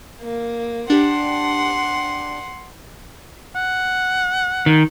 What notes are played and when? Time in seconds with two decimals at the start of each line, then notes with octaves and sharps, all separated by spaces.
0.21 A#3
0.90 D4 G4 F#5 C6
3.55 F#5
4.66 D#3